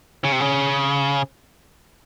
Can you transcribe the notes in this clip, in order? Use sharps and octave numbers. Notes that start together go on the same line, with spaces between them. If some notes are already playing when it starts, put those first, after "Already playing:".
C#3
C3
C#3